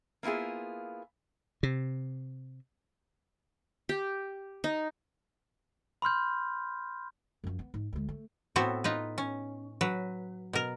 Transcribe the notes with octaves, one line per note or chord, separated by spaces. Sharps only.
A#3 B3 E4 F4 G#4
C3
G4
D#4
B5 C6 F6 G6
F#2 F3
B3
G#2
D2 G#3
A3
A2 B3 C4 F#4 A4 B4
D#4 F4 B4
C#4
F#3 B4
B2 A#4